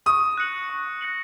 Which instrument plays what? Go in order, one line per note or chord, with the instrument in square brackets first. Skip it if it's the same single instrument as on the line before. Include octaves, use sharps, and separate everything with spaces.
[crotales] C#6 [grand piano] D#6
[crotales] F#6 A#6 C#7 F#7
C#6
F#6 A#6 C#7 F#7